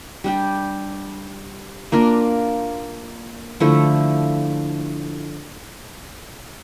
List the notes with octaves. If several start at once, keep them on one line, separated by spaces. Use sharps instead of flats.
G3 D4 G4
A#3 D4 F4 A#4
D3 F3 A3 E4